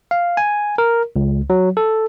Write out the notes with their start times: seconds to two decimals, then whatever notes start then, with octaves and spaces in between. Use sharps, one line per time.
0.11 F5
0.37 G#5
0.78 A#4
1.16 C#2
1.50 F#3
1.77 A4